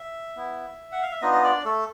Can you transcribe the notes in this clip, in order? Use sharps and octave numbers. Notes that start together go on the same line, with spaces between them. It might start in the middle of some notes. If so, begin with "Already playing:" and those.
Already playing: E5
B3 E4
F#5
F5
E5
B3 D4 D#4 F4 D#5
D#5
D4 D5
A3 A4